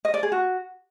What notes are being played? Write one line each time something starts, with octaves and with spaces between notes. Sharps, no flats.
D#5
D5
G#4
F#4